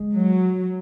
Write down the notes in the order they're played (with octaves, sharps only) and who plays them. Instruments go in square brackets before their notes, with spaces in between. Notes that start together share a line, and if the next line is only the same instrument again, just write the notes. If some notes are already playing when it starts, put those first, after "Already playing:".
Already playing: [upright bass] G#3
[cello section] F#3